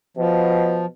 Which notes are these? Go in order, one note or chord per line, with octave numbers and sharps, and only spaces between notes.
B2 F3